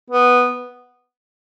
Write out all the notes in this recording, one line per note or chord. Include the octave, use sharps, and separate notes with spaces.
B3